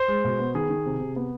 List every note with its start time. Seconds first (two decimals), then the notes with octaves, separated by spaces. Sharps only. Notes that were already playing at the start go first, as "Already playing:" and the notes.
Already playing: C5
0.08 G#3
0.24 B2
0.39 B3
0.54 D#3 G#4
0.70 D#3
0.86 C3
1.00 C3
1.16 B3